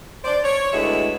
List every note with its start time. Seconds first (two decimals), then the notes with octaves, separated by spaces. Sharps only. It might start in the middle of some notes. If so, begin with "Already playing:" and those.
0.24 C5 D5
0.44 C#5
0.73 D2 G#3 B3 E4 E5